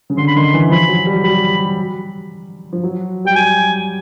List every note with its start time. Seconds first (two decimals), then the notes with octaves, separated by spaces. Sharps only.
0.10 C#3
0.17 D3 C6
0.28 B5
0.36 D#3 C6
0.54 E3
0.70 F3 B5
0.88 F#3
1.06 G3
1.23 G3 B5
2.73 F3
2.83 F#3
3.25 G3 G5
3.36 F#3 G#5